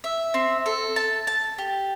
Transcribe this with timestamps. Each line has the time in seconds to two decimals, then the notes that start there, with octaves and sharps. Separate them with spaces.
0.04 E5
0.34 C4
0.66 A4
0.96 A5
1.27 A5
1.58 G4